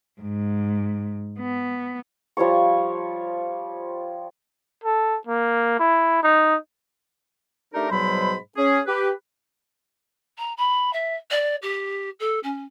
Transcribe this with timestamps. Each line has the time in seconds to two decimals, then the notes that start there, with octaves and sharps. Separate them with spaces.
0.21 G#2
1.39 B3
2.37 F3 G3 C#5 C#6
4.84 A4
5.27 A#3
5.79 E4
6.23 D#4
7.73 A3 D4 D#4 G4 A#4
7.90 G#2 B2 F#3 G3 C5 B5
8.56 C#4 G#4
8.87 G4 B4
10.38 A#5
10.57 B5
10.93 E5
11.31 D5
11.62 G4
12.20 A4
12.43 C#4